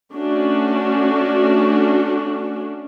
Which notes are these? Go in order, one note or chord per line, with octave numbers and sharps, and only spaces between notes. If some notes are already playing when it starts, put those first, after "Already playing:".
A3 C#4 D4 F#4